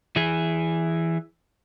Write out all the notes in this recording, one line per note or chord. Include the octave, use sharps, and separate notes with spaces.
E3 G#4